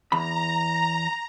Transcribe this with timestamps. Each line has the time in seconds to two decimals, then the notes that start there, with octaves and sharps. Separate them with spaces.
0.12 E2 A#5 B5